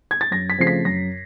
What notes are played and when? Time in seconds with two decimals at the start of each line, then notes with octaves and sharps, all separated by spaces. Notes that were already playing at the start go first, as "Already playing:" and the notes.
0.11 G#6
0.21 A6
0.31 F#2 A#6
0.50 B6
0.58 C#3 F3 A3 C4 C7
0.67 B6
0.85 F#2 A#6